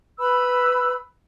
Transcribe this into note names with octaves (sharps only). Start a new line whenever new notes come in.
B4 B5 E6